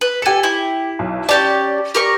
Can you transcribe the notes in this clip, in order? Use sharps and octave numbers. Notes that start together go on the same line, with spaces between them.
B4
G4 A4 G#5 C#7
E4
B1
C#4 G4 D5 A5
G4 A#4 C#6